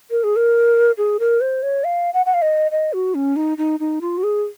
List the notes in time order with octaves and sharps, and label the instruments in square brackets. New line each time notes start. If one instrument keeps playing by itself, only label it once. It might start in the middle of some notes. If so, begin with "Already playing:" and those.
[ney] A#4
G#4
A#4
G#4
A#4
C5
C#5
F5
F#5
F#5
F5
D#5
D#5
F#4
C#4
D#4
D#4
D#4
F4
F#4
G#4